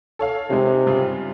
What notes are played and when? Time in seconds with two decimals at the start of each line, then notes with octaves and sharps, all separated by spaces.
0.19 A4 C#5 F5
0.50 C3 G#3 D#4
0.87 G2 C#3 F4